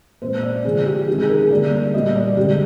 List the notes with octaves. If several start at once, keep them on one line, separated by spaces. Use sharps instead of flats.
A#2 G#3 C4 C5
D5
D3 F3 G#3 C4 G#4
G4
D#3 G#3 C4 G4
G#4
A#4
G#4
D3 G3 A#3 D5
A#2 G3 A#3 D#5
D5
D3 G#3 C4 G4